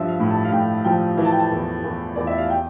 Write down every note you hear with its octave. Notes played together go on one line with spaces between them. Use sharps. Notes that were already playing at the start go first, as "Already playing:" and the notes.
Already playing: G2 F3 E5
F5
A2
A5
F5
A2 G5
F3 G5
E3
A5
G5
A5
E2
E2
E2 D5
E5
F5
G5